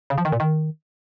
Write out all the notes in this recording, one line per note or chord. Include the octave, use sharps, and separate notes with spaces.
C#3
F3
D#3
A#2
D#3